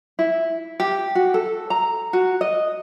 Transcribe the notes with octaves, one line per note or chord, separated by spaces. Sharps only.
E4
G4
F#4
A4
A#5
F#4
D#5